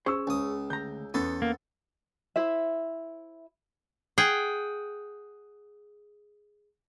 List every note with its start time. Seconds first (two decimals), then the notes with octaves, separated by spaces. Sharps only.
0.06 C#4 G#4 C5 C#6 E6
0.27 C#2 D#6
0.70 D2 A#5 G6
1.14 E2 B3 C#4 A4 C6
1.42 A#3
2.36 E4 C5 E5
4.18 G#4 F#5 G5